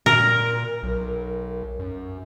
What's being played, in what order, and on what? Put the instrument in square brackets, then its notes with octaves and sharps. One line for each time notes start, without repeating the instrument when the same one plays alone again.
[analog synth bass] A#2 [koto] A#4
[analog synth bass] B1
F#2